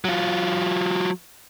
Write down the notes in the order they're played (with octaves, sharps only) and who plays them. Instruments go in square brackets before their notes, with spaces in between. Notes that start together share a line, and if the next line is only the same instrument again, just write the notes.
[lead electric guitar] F#3 F4